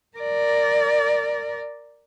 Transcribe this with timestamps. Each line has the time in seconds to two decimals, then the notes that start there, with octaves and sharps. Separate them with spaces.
0.18 A#4 D5